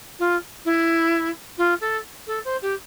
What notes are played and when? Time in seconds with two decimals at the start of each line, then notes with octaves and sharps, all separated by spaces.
0.19 F4
0.65 E4
1.57 F4
1.80 A4
2.27 A4
2.44 C5
2.61 G4